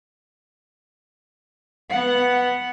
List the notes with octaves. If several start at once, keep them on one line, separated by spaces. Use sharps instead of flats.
B3 F#5